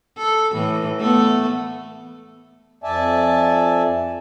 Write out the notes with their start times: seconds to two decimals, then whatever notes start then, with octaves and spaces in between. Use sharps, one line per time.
0.18 A4
0.53 A2 E3
0.99 A3 B3
2.84 F2 D5 E5 G#5 A5